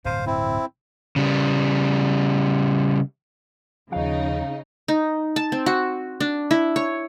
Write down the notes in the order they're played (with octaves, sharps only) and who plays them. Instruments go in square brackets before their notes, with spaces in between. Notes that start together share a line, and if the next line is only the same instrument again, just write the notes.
[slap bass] D1 G2 C3 [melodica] C5 F5
[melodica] C4 E4
[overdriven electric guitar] C#3 G3
[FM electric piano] D#2 F3 [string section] C#3 D#4 [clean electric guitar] F5
[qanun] D#4
A5
C4
F#4
D4
E4
C#5